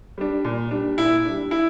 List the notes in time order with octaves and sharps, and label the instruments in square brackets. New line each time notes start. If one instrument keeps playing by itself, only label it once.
[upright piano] G3 D4
A#2
G3 D4
[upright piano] A#2 [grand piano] E4
[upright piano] G3 D4
[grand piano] E4